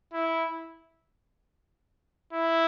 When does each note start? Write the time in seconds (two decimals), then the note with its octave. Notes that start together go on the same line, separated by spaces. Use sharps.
0.13 E4
2.33 E4